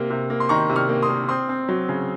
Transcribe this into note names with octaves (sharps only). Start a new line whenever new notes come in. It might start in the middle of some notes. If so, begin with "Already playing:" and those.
Already playing: C3 A#3
C3
A#3
C6
D#3 A#5 C#6
C3
C#6 F6
A#3
C6 D#6
A#3
C4 C6 D#6
C4
F#3
C#3